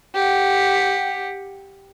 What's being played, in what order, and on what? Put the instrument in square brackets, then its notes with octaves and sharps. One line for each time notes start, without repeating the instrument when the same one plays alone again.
[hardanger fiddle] G4 F#5